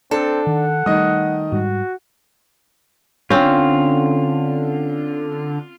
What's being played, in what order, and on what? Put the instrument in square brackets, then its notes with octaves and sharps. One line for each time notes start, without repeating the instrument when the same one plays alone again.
[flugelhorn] C4 [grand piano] D4 [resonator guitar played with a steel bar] A4
[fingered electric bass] D#3 [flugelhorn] F#5
[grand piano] D#3 D#5 D#6 [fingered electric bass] G3 A3
[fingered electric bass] G#2 G3 [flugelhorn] F#4
[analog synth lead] D3 [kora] C4 C#4 [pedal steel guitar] F4